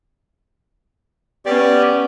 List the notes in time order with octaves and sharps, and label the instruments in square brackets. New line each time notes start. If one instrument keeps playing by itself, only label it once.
[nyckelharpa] B3 C#4 [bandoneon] G4 D5